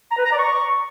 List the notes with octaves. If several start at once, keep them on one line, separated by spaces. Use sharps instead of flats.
A#5
B4
A#5
D5
C#6